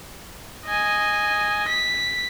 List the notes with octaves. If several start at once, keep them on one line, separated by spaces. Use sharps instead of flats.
D#5 G#5
B6